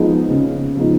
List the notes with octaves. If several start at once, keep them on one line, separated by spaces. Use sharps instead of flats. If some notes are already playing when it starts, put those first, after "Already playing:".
Already playing: F3 G#3 B3 D#4
C#3
F3 G#3 B3 D#4